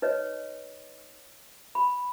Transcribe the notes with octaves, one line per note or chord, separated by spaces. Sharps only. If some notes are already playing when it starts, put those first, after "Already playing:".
D#4 B4 C#5 D#5
B5